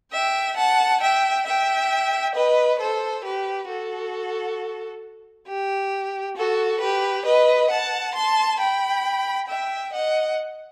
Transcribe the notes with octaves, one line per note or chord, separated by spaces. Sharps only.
E5 G5
F#5 A5
E5 G5
E5 G5
B4 D#5
A4 C5
G4 B4
F#4 A4
G4
F#4 A4
G4 B4
B4 D#5
F#5 A5
A5 C6
G5 B5
E5 G5
D#5 F#5